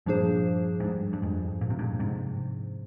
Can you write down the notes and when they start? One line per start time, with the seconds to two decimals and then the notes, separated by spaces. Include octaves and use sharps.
0.06 G2 A#2 F3 A#3 D4 G#4 C5
0.80 G#2
0.84 G2
1.13 G2
1.22 F2 G#2
1.61 A#2
1.70 C3
1.79 G2 A#2
2.00 G#2 C3